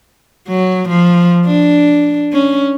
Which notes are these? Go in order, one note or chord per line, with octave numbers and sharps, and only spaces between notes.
F#3
F3
D4
C#4